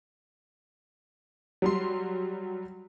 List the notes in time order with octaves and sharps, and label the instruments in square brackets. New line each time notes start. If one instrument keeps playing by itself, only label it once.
[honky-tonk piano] F#3 G3 C6